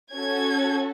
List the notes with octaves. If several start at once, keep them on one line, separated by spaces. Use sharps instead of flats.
C#4 F#4 A4 G#6